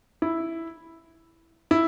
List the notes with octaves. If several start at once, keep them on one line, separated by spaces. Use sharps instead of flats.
E4
E4